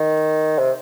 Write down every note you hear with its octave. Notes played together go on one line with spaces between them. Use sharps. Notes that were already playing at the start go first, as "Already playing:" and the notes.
Already playing: D#3
C3